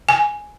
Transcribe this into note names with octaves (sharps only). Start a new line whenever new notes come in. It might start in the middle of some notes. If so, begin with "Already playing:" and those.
G#5